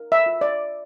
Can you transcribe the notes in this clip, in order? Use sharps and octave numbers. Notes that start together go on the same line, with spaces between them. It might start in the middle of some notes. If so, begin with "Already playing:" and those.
Already playing: A#4
E5
F4
D5